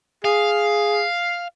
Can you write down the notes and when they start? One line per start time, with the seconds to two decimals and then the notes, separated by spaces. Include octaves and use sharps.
0.24 G#4 F5